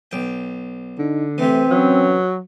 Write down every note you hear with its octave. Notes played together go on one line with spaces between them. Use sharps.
B1 G5
D3 D#4
C3 E3 A3 C4
F#3 C#4